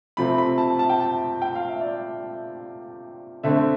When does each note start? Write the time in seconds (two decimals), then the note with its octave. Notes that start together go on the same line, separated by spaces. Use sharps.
0.17 C3 F3 A3 C4 B5
0.38 B5
0.58 A5
0.79 A5
0.89 G5
1.00 A5
1.42 G5
1.55 F5
1.68 E5
1.81 D5
3.43 D3 A3 C4 E5